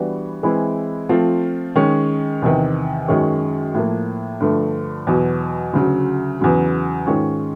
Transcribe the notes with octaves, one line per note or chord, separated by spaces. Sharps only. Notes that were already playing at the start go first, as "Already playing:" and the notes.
Already playing: E3 G3 B3 D4 F#4
E3 G#3 C4 E4
F3 A3 C4 F4
D#3 G#3 C#4
E2 C3 D#3
F#2 D#3 G#3 C#4
A2 F3 A#3
G2 D3 F3 A3
E2 B2 F#3
D2 C#3 F#3
E2 C#3 F#3
G#2 D#3 G#3 C#4 F4